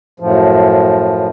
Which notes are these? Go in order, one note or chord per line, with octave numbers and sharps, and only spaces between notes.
F#2 A2 F3